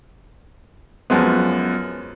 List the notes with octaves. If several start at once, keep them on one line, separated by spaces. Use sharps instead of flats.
F#2 F3 G#3 B3